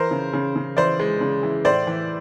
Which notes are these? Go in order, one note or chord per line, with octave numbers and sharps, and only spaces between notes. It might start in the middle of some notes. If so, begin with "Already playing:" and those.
Already playing: E3 A#4 C5
C#3
C#3
C#3
E3 C5 D5
G#3
C#3
E3
A2 C5 D5
E3